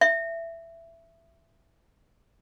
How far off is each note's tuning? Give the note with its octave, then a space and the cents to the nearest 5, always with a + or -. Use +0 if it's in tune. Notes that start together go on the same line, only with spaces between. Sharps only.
E5 +15